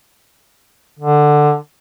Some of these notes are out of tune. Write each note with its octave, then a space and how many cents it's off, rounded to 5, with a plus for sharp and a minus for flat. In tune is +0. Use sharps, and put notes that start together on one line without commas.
D3 +10